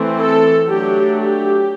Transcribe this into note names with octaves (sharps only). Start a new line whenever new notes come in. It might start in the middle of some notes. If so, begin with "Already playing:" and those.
Already playing: E3 A3 C4
A4
F#3 A3 D4 G4
G4